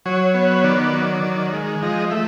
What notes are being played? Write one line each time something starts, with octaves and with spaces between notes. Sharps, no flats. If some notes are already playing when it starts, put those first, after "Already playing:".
F#3 C#5
B3
C#5
D#3 D5
F#3
D#3
G#3
F3 D#5
A3 E5